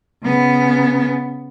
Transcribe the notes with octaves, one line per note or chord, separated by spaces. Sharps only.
C#3 B3